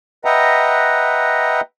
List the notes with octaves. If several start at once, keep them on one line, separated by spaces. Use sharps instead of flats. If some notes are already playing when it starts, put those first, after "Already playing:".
B4 D#5 E5 F#5 G5 A#5